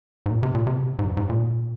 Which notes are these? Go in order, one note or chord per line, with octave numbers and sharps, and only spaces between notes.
G#2
A#2
C3
A#2
C3
G#2
F#2
G#2
A#2